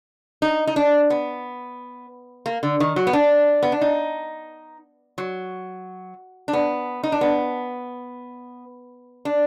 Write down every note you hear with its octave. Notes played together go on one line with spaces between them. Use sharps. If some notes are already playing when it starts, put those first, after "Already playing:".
D#4
D#4
D4
B3
A#3
D3
D#3
F#3
B3
D4
B3
D4
D#4
F#3
D4
B3
D#4
D4
B3
D4